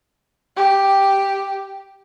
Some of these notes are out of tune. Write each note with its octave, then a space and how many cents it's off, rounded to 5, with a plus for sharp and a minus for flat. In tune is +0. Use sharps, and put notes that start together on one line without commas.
G4 +0